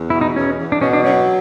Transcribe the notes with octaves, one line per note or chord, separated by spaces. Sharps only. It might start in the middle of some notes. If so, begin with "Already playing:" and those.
Already playing: E2
B2 E4
D#4
E2 C#4
E2
D4
B2 C#4
D4
F#3 C#4